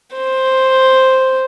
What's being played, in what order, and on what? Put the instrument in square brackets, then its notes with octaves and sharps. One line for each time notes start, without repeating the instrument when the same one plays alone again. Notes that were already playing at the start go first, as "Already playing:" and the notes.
[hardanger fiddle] C5